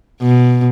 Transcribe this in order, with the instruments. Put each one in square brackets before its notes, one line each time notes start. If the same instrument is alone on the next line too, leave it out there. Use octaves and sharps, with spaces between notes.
[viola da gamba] B2